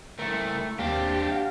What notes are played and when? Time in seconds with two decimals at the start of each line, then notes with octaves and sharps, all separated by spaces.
0.19 A3 E4 A#4
0.79 D#2 A#3 C4 D4 G4 F5
1.32 F5 F#5